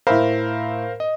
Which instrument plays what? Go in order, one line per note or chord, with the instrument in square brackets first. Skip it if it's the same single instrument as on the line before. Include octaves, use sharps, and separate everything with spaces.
[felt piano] A2 E5 B5 [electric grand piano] A#4 C5 F5
[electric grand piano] D#5